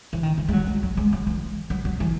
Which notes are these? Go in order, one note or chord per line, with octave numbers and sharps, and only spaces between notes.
E3
D#3
E3
G#3
F#3
G#3
F#3
G#3
F#3
E3
F#3
F#3
E3